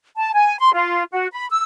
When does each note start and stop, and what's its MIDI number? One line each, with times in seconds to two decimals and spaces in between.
0.16 0.31 81
0.34 0.57 80
0.60 0.73 84
0.74 1.03 65
1.12 1.27 66
1.33 1.46 83
1.50 1.63 88